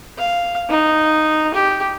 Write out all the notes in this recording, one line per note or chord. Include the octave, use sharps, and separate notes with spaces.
F5
D#4
G4